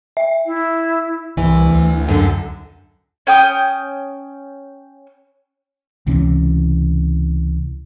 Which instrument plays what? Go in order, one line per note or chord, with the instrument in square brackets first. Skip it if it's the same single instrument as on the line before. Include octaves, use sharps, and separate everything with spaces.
[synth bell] E5
[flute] E4
[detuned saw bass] C2 [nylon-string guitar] E3
[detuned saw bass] D2
[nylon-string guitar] F#2 D3
[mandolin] C#4 G5 D#6
[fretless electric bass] C#2 C3 E3 C#4